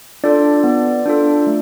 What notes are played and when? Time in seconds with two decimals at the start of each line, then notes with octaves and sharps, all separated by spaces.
0.24 D4 F4 A4 D5
0.64 B3
1.06 D4 F4 A4
1.47 A3